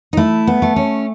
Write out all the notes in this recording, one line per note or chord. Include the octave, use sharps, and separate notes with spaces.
D#4
A3 E4
B3
A3
C#4